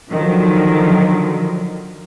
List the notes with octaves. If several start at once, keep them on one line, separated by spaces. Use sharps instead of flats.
D3 D#3 F3 F#3